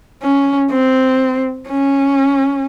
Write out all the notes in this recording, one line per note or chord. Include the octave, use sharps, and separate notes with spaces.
C#4
C4
C#4